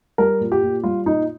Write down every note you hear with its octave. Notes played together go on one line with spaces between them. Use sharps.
G3 A#4
A#2
G4
A#2
G3 F4
A#2 D#4